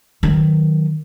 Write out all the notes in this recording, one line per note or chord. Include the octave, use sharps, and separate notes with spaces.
D#3 F#3